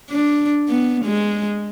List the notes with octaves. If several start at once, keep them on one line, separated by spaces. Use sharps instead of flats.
D4
B3
G#3